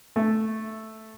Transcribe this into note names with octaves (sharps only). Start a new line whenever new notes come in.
A3